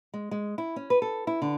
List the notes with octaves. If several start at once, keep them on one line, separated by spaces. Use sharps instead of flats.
G#3
G#3
E4
C#4
B4
A4
E4
D3